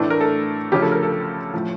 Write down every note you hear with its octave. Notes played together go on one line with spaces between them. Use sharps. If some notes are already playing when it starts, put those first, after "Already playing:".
Already playing: A2 E3 A3 D4
A#4
A4
D2 C#3 F3 C#4 G4
A4
A#4
A4
A2 F3